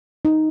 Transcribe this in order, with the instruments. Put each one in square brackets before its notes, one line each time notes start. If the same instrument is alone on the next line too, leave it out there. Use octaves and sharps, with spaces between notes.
[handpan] D#4